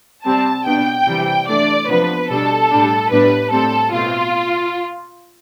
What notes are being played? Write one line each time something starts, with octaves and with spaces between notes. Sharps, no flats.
C3 G3 C4 A5
B2 B3 D4 G5
C3 E3 G3
E3 A3 D4 D5
C3 F3 B3 D4 B4
B2 G3 D4 A4
A2 G3 D4
A2 G3 B3 D4 B4
A2 G3 C4 A4
B2 A3 C4 F4